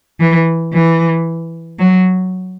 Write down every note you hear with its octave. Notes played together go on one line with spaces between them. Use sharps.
E3
E3
F#3